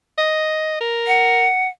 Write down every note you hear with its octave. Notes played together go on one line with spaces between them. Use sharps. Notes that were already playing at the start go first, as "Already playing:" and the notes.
D#5
A#4
F#5